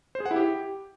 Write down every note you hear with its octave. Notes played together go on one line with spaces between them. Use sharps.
C5
G#4
F#5
E4
G4